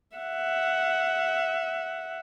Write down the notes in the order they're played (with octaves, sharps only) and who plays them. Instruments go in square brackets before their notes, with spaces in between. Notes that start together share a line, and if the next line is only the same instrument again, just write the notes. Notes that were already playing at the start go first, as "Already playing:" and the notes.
[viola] E5 F#5